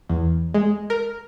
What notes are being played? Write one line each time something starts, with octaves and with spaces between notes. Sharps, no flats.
E2
G#3
A#4